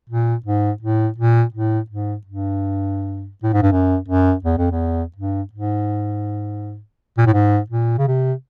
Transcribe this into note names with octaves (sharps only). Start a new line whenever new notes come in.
A#2
G#2
A2
A#2
A2
G#2
G2
A2
G#2
G2
F#2
F#2
E2
F2
E2
G2
G#2
A#2
A2
G#2
A#2
C#3
C3